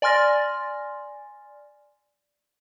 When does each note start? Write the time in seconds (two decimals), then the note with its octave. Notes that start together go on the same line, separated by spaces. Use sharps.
0.02 D5 G#5 C6 F6 A6 A#6